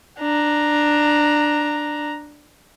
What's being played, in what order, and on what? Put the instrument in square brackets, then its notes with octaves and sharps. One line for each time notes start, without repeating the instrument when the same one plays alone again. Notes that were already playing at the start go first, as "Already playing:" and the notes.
[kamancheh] D4 A#5